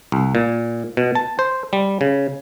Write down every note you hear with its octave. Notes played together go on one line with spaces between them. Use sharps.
C2
A#2
B2
A5
C5
G3
C#3